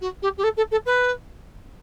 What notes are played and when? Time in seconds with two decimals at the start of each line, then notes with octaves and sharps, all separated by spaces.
0.01 F#4
0.22 G4
0.38 G4
0.44 A4
0.57 A4
0.71 A4
0.86 B4